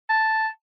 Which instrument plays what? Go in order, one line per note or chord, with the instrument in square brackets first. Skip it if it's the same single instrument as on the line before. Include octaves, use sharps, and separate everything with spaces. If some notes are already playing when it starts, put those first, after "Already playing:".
[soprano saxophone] A5